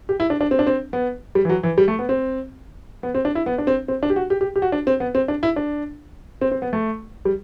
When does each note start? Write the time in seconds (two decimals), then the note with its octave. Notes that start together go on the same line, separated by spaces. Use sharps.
0.09 G4
0.20 E4
0.30 D4
0.41 D4
0.51 C4
0.59 D4
0.67 C4
0.93 B3
1.35 G3
1.45 E3
1.49 F#3
1.63 E3
1.78 G3
1.88 A3
1.99 B3
2.09 C4
3.03 B3
3.15 C4
3.25 D4
3.35 E4
3.46 B3
3.58 D4
3.67 C4
3.88 C4
4.03 D4
4.10 G4
4.16 F#4
4.30 G4
4.41 G4
4.56 G4
4.62 F#4
4.72 D4
4.87 C4
5.00 B3
5.15 C4
5.28 D4
5.43 E4
5.56 D4
6.41 C4
6.51 C4
6.62 B3
6.73 A3
7.25 G3